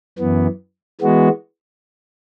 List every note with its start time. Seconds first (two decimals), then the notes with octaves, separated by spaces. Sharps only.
0.18 F#2 E3 B3
1.01 E3 G#3 B3 F#4